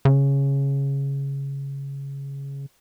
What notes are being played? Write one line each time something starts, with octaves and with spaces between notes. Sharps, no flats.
C#3